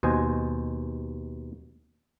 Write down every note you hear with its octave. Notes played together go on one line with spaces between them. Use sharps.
D#2 B2 C5 D#5 G#5